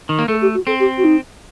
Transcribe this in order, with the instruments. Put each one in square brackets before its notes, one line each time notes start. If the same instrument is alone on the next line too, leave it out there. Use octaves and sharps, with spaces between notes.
[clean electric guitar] D#3
A#3
[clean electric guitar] A3 [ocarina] A4
[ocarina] G4
F#4
[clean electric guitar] C4 [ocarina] A4
[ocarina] G4
F#4
D#4